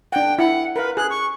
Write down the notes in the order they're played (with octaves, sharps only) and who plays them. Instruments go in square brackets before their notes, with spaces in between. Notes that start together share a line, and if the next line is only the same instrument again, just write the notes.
[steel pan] D4 F#5 [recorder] G5
[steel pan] E4 [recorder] F#5
[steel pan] A#4 F5 [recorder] B4
[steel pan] G#4 [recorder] F#6
[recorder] C#6